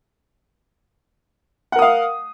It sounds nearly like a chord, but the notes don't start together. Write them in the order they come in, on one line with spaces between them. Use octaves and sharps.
F#5 A#4 D#6 F5